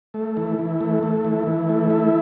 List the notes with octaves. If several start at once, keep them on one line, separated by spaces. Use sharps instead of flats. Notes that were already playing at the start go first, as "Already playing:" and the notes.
A3
E3
E3
A3
A3
E3
E3
A3
E4